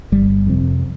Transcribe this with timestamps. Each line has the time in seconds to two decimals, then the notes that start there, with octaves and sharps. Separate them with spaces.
0.12 G1 G3
0.47 F2 C3